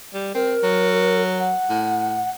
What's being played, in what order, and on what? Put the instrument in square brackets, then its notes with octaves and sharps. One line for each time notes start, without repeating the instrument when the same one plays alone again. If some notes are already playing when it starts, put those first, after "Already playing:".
[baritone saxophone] G3
[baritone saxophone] C4 [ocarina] A#4
[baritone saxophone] F#3
[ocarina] F#5
[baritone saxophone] A2